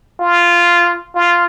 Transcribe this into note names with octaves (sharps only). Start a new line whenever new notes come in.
F4
F4